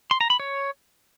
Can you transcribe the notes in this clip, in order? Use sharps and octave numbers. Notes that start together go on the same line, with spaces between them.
C6
A#5
B5
C#5